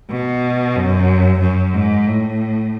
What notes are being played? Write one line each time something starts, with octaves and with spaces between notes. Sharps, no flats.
B2
F#2
F#2
G#2
A2